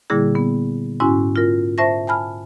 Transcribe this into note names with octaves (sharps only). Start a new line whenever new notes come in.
A#2 D3 G3 A#3 E4 G#4
B3
G#2 C#4 E4 F#4 G#5
F4 A#4
C5 E5 A5 C#6 A#6
G#5 A5 B5 F6